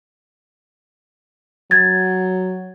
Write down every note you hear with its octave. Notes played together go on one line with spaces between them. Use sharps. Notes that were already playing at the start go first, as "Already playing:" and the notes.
F#3 G#6 A6